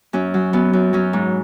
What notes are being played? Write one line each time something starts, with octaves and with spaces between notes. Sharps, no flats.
F#2 C#4
F#3
F#2 B3
F#2
F#3 C#4
G#2